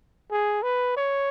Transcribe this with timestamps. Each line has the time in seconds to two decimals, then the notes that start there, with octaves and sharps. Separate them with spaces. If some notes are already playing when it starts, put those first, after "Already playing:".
0.31 G#4
0.63 B4
0.96 C#5